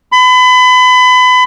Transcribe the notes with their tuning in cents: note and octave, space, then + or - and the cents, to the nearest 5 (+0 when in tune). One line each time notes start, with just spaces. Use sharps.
B5 +30